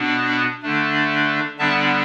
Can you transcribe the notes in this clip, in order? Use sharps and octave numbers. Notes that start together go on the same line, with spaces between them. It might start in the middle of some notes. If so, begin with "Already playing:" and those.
Already playing: B2 B3 D4
D3 A3 D4
D3 G3 B3 D4 E5 A5